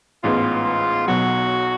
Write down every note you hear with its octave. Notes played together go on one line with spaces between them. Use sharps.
A1 G#2 G#3 B3 F4
B1 B2 F#3 F#4